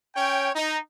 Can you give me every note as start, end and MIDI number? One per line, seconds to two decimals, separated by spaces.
0.14 0.48 61
0.14 0.48 73
0.14 0.48 79
0.55 0.77 63